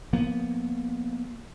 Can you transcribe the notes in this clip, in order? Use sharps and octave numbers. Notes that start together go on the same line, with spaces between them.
F3 A#3 B3